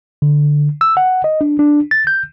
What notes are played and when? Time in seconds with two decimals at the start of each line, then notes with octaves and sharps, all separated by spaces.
0.22 D3
0.81 E6
0.97 F#5
1.24 D#5
1.41 D4
1.59 D4
1.91 A6
2.07 G6